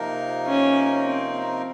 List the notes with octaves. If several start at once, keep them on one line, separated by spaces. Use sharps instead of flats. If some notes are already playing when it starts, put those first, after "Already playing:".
Already playing: C3 F3 A#3 D#4 A#4
C#4
C4